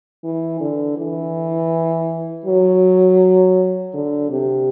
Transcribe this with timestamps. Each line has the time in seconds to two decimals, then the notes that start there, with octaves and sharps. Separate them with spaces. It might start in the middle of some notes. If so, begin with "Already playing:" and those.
0.24 E3
0.60 D3
0.97 E3
2.46 F#3
3.94 D3
4.30 C3